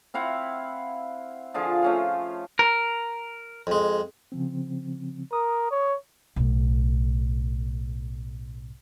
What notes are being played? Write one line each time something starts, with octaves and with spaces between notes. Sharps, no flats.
C4 E4 F5 F#5
D3 F3 F4 G#4
A3 C#4 F4
A#4
F2 G#3
C#3 F3 C4
A#4 D#6
C#5
B1 A2